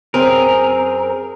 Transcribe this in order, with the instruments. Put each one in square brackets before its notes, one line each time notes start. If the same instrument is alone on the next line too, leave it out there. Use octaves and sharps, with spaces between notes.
[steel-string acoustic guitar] F#2 C4 G#4 [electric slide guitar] A#4